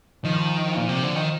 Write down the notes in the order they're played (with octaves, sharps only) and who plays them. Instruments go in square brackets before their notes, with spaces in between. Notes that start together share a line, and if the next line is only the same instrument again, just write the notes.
[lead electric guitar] D#3 [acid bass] F3
[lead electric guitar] A#2
C3
D3
D#3